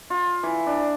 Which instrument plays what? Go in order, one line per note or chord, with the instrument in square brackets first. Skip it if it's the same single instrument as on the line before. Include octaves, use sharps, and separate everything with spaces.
[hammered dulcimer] F4
E3
D4